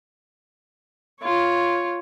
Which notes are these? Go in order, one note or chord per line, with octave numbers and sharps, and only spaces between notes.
F4 C#5